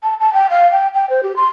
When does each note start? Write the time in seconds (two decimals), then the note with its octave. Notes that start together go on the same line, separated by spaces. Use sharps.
0.03 A5
0.20 A5
0.33 G5
0.50 F5
0.72 G5
0.94 G5
1.10 C5
1.23 G4
1.36 C6